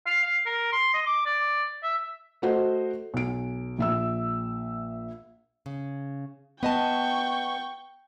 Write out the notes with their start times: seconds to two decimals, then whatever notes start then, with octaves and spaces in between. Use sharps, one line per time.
0.07 F5
0.24 F5
0.46 A#4
0.73 C6
0.94 D#5
1.06 D6
1.26 D5
1.83 E5
2.42 A3 F#4 C5 D#5
3.14 B1 D7
3.78 A#1 E5 E6
5.66 C#3
6.63 B3 D#5 G5 A5 C#6